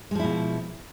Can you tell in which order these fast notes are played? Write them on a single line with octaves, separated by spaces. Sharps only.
G#3 F3 E4 B2